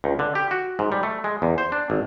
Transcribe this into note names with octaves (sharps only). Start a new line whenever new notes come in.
C#2
D3
G4
F#4
G#2
G3
A3
G#3
E2
C5
D4
G#1